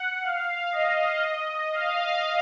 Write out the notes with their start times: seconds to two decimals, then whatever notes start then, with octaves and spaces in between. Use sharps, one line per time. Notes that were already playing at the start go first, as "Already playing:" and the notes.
Already playing: F#5
0.22 F5
0.72 D#5
1.72 F5